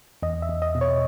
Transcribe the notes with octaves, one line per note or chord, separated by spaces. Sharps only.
E2 D#5
E5
E2
D#5
B2
C#5